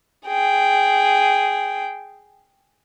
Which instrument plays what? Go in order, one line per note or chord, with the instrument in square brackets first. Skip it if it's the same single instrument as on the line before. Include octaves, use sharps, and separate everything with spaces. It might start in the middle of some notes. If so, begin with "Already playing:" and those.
[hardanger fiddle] G#4 G5